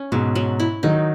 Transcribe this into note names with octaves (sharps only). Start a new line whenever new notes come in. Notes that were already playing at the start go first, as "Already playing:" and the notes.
Already playing: C#4
G#2 B2 F#3
F#3
E4
D#3 F#3 D#4